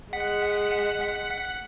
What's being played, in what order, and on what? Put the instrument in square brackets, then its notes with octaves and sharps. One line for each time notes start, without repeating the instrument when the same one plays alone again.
[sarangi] G#3 [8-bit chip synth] F#5 B6 C#7